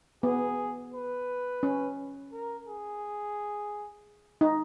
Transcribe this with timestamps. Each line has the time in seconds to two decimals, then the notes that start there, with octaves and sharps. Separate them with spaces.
0.23 B3 G#4
0.94 B4
1.63 C#4
2.32 A#4
2.68 G#4
4.41 D#4